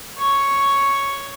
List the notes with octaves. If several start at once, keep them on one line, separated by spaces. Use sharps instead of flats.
C#5 C#6